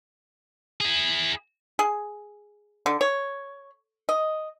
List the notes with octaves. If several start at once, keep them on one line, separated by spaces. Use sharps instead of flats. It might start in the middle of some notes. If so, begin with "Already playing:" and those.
E4 G#4
G#4
D3
C#5
D#5